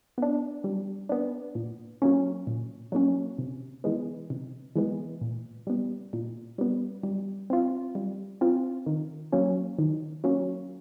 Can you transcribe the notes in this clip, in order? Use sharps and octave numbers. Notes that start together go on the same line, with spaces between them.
B3 D4
G3
B3 D4
A#2
F#3 A#3 C#4
A#2
F#3 A#3 C#4
C3
E3 G#3 B3
C3
E3 G#3 B3
A#2
G3 B3
A#2
G3 B3
G3
C4 F4
G3
C4 F4
D#3
F#3 A#3 C#4
D#3
F#3 A#3 C#4